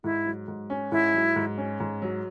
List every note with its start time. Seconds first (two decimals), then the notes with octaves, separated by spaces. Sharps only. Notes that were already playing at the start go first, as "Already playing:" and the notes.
0.04 G#2 E4
0.26 F#3
0.48 G#2
0.70 C#4
0.92 G#2 E4
1.14 F#3
1.36 G#2
1.58 C#4
1.80 G#2
2.02 F#3